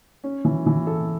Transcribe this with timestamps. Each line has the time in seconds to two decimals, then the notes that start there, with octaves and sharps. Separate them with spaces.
0.24 C#4
0.45 E3
0.66 E3
0.87 A4